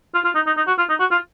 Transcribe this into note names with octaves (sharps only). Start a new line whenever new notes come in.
F4
F4
D#4
D#4
D#4
F#4
F4
D#4
F#4
F4